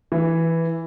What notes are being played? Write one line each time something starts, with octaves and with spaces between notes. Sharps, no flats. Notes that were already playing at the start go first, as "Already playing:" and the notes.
E3